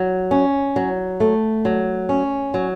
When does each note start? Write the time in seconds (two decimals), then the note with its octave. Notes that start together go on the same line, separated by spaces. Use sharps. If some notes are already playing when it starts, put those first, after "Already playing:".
Already playing: F#3
0.31 C#4
0.76 F#3
1.20 A3
1.65 F#3
2.09 C#4
2.54 F#3